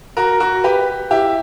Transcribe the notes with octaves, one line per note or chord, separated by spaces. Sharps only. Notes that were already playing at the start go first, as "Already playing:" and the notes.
F#4 A#4
F#4 A#4
G4 B4
E4 G4